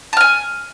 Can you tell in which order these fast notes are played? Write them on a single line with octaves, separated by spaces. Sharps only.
A5 F6 G#5